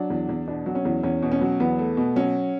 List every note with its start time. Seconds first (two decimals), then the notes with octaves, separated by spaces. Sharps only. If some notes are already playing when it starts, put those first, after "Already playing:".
Already playing: F#3 D4
0.10 E2
0.29 E2
0.47 B2 D4
0.66 F#3
0.75 C#4
0.85 E2
1.03 E2 C#4
1.22 B2
1.32 C#4
1.41 F#3
1.60 E2 B3
1.79 A3
1.97 B2
2.16 F#3 C#4